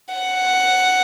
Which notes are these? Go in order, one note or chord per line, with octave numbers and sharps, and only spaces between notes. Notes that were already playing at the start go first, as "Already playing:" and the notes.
F#5